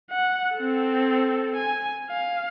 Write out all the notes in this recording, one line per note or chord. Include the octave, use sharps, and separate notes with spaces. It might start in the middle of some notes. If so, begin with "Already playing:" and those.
F#5
C4 A4
G#5
F5